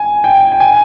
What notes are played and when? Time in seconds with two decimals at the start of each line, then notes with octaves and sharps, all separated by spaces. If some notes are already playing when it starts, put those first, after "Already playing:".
Already playing: G#5
0.24 G5
0.52 G5
0.60 G#5